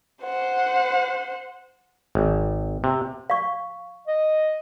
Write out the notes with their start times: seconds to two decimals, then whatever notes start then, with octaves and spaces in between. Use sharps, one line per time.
0.24 C5 F#5
2.15 G#1
2.84 C3
3.30 F5 C#6
4.07 D#5